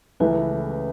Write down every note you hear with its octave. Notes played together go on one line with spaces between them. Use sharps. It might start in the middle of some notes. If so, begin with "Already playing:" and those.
C#2 C#3 E3 A3 E4 B4